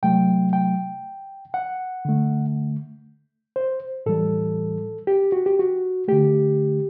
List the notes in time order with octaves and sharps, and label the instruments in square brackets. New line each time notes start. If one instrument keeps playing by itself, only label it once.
[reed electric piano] C3 F#3 A3 G5
G5
F#5
D3 A3
C5
A2 E3 G3 A4
G4
F#4
G4
F#4
D3 A3 G4